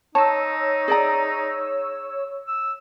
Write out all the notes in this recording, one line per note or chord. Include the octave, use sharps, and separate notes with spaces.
D#4 C#5 A5 E6
G#4 D5 A#5
E6